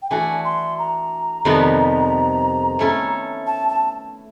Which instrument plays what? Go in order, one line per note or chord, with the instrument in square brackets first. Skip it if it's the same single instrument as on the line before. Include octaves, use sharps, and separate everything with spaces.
[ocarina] G5
[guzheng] E3 A3 D4 F#4 [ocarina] G#5
[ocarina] C6
A#5
[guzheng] F2 C3 D#3 G3 B3
A3 C#4 E4 A4
[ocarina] A5
A5